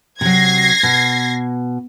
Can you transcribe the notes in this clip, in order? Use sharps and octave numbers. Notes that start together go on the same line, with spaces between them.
C3 F#3 G#6 A#6 C7
B2